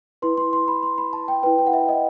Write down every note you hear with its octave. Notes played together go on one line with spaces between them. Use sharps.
E4 B4 C6
C6
C6
B5
C6
B5
A5
G5
E4 B4 G5
G5
F#5
E5
D#5